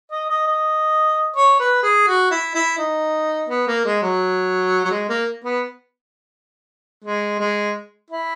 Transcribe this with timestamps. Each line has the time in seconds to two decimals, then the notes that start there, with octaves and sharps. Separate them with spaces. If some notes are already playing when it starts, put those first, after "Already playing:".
0.11 D#5
0.29 D#5
0.47 D#5
1.36 C#5
1.59 B4
1.83 G#4
2.07 F#4
2.31 E4
2.54 E4
2.78 D#4
3.49 B3
3.67 A#3
3.85 G#3
4.02 F#3
4.84 F#3
4.91 G#3
5.09 A#3
5.44 B3
7.04 G#3
7.40 G#3
8.11 E4